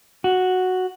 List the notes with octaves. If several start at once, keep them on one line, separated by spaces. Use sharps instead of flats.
F#4